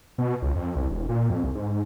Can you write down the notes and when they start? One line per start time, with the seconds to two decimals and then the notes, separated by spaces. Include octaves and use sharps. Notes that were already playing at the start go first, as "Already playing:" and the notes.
0.18 B2
0.42 C#2
0.55 F2
0.75 C2
0.90 E1
1.09 A#2
1.30 F2
1.44 C2
1.55 G#2